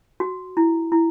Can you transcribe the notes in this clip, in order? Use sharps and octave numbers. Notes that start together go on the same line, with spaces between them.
F#4
E4
E4